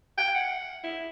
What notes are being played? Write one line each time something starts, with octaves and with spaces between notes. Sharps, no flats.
G5
F#5
E4